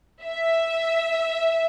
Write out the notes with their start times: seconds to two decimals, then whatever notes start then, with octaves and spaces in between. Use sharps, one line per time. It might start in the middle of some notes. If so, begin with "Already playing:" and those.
0.24 E5